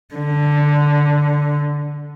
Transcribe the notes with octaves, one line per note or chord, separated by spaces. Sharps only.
D3